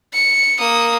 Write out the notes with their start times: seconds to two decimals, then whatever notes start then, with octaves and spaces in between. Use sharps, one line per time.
0.14 C#7
0.59 A#3 D#6